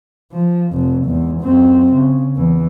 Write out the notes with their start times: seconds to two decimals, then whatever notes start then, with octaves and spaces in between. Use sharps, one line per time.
0.33 F3
0.72 F1 F2
1.05 E2 G#2
1.41 F#2 C4
1.92 C#3
2.36 E2 E3